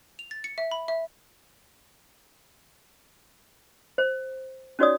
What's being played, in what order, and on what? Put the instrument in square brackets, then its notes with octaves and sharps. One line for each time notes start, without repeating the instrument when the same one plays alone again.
[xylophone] F7
A6
C#7
E5
B5
E5
[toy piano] C5
C#4 D#4 F#4 C#5 D5 D#6